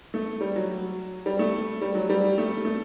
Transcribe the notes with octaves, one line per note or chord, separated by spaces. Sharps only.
A3
G3
F#3
G3
A3
G3
F#3
G3
A3
A3